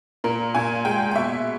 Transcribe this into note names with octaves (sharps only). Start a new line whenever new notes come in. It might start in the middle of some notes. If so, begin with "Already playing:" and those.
A#2 A#4
A#2 G#5
G#3 G5
G5
B2 E5